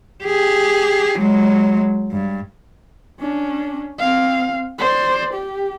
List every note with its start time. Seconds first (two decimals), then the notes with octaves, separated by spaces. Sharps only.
0.24 G4 G#4
1.18 F#3 G#3
2.11 G2
3.20 C#4 D4
3.99 C4 F5
4.79 C5 D5
5.34 G4